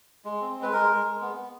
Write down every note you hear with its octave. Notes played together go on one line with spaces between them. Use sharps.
G#3
C4
G#3
B4
G#3 A#4
G#3
G#3
B3
B3